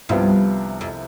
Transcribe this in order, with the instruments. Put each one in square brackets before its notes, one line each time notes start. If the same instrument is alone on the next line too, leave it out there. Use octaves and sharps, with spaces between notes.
[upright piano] C2 C3 F3 B3 F4 [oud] G2
[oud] F2